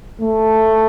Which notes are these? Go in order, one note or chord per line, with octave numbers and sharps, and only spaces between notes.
A3